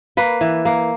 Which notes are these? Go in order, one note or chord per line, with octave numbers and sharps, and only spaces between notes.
A#3 B4
E3
A#3